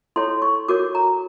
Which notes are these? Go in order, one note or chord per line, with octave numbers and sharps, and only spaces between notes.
E4 A4 C#5 C6
C#6
F#4 A#4 C#5 D6
A#5